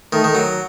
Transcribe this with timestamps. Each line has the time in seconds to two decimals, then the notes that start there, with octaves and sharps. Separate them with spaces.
0.13 D#3 A3
0.24 D#3
0.35 F#3